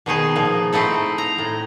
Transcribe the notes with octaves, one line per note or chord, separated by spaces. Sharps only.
B2 D#3 D#4 G#4
A#2 F3
A3 C4 D#4 E4 A4
A#5
A2